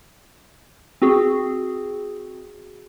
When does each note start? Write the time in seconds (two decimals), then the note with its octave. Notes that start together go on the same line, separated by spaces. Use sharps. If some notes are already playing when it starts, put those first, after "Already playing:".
1.02 C4 F#4 G#4